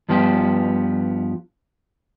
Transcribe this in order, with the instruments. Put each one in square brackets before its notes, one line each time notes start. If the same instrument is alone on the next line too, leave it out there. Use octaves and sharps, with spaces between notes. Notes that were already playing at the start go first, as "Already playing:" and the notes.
[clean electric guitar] G2 F3 B3 F4 G4